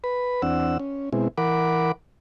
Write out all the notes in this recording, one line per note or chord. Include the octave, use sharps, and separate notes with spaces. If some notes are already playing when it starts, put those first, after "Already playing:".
B4 B5
E2 C4 D4 F#5 E6
C#4
B2 G#3 C4 E4
E3 A#4 F#5 B5 D6